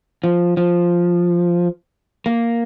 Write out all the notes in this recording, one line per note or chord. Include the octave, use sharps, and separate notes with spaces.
F3
F3
A#3